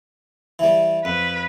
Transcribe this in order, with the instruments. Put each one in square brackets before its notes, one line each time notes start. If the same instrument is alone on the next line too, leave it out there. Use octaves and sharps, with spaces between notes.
[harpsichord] E3 G3
[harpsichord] F2 [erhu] B4